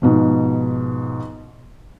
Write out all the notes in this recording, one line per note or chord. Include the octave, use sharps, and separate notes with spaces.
G#2 B2 F3